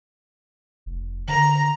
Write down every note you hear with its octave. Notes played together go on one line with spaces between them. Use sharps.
F1
D3 A#5